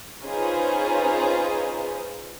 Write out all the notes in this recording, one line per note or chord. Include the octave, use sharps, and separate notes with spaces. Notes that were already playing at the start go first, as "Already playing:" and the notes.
C#4 D#4 F4 G#4 B4 C5